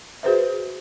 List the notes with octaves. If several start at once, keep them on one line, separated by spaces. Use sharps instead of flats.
F#4 G#4 B4 C5 E5